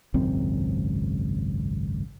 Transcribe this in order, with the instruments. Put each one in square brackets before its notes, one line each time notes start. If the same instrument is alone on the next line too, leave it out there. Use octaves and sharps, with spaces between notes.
[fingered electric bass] G#1 C#2 F#2 C4